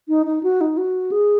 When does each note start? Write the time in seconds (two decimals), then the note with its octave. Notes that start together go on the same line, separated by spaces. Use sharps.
0.08 D#4
0.26 D#4
0.43 F#4
0.61 D#4
0.77 F#4
1.12 G#4